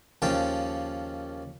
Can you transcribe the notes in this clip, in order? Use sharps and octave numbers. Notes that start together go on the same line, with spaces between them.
D#2 C#3 F3 C#4 G5 A5